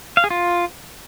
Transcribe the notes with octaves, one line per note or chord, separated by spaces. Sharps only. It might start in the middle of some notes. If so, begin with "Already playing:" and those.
F5
G#4
F4